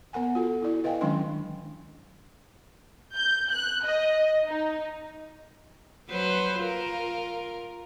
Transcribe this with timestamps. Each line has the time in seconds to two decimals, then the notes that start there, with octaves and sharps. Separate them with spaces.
0.13 B3 A#4 F#5 G#5
0.35 F4 F#4 A4
0.63 E4 D5
0.84 B4 D#5 F5 G5 G#5
1.01 D#3 F#3 G#3 C#4 D4 C6
3.15 G6
3.51 F#6
3.85 D#5
4.47 D#4
6.10 F#3 B4 C5
6.60 F4 A#4